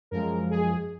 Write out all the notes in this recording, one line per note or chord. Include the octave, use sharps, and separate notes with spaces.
F#2 F3 G#3 A#4
G#4